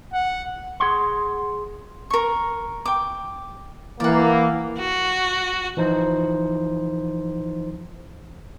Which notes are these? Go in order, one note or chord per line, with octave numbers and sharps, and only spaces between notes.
F#5
G#4 F#5 C6
A#4 C#6
G5 D6
E3 A#3 D5 F#5
F#4
E3 F3 D#4 C5